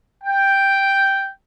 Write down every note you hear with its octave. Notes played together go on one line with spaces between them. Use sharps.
G5